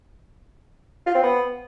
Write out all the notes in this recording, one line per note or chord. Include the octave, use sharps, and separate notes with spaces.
F4
C4
B3